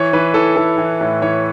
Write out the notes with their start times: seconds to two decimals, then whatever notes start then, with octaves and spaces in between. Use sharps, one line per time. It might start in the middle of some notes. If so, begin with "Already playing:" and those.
Already playing: E3 C#5
0.13 E3 B4
0.34 E3 A4
0.56 E3 A4
0.78 E3
1.01 A2
1.22 E3 C#5